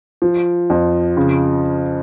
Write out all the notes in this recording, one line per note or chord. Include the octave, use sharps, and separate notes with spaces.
F3
F2
C#3